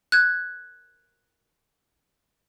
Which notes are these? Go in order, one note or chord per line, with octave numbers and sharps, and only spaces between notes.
F#6 G#6